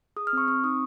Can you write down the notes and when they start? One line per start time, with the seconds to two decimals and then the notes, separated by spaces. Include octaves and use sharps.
0.17 G#4 D#6
0.27 F6
0.33 C4 C#6
0.48 C4 C#6
0.64 D#4 D#6